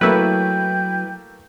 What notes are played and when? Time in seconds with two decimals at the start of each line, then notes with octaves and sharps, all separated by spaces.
0.01 F#3 A3 A#3 E4 B4 G5